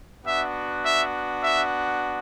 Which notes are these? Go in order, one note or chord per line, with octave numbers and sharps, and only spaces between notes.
B3 D4 F#4 E5
E5
E5